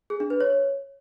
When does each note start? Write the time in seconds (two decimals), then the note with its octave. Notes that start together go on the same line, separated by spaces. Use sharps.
0.10 G#4
0.20 D4
0.30 B4
0.41 C#5